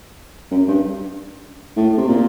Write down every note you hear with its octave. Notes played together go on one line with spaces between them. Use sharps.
F#2
G2
A2
C3
A#2